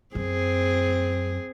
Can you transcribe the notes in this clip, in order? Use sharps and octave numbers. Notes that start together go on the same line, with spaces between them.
F#2 C4 G#4